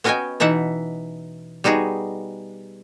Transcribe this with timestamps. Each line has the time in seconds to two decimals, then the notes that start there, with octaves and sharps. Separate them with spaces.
0.04 B3 C#4 F#4 D#5 G5 G#5
0.40 B2 E3 D#4 E5 F#5
1.64 G3 B3 D#4 F#4 G#4